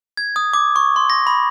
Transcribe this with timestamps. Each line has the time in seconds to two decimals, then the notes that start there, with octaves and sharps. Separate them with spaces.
0.17 G#6
0.36 D#6
0.53 D6
0.76 C#6
0.96 C6
1.10 A#6
1.27 B5